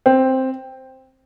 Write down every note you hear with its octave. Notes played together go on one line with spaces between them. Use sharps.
C4